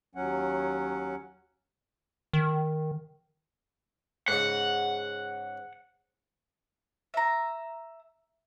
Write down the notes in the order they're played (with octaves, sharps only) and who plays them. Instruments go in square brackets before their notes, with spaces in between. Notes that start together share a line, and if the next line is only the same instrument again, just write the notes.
[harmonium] D#2 F#3 C#4 F#5
[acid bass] D#3
[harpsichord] G#2 C#3 [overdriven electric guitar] F#5
[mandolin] E5 A#5